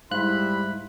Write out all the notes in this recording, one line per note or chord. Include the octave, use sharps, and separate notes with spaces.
G#2 G3 E4 F5 B5 C6 F#6